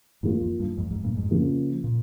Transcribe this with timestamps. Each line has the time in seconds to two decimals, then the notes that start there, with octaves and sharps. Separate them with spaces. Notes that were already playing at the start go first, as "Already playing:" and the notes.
0.23 F2 G#2 D#3 A#3 F4
0.41 F2
0.60 G2
0.77 F2 G#2
0.91 F2 G#2
1.03 G2 A#2
1.17 F2 G#2
1.31 C#3 F3 A#3
1.84 A#2